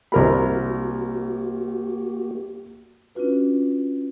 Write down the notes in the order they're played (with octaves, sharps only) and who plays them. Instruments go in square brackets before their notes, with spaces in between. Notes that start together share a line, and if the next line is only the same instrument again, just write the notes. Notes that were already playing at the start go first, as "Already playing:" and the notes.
[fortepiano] C2 A#4 B5 [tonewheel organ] A#3 F#4 G4
[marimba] C#4 D4 F4 F#4 B4